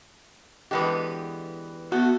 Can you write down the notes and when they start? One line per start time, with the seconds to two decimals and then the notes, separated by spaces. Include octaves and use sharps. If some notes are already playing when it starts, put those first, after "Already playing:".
0.71 B2 D3 E3 G#3 B3 G4
1.92 A3 B3 F#4